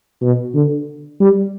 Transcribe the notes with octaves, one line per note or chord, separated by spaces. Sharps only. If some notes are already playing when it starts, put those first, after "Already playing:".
B2
D3
G3